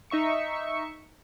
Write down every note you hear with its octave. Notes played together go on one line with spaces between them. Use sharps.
D#4 E5 C#6 C#7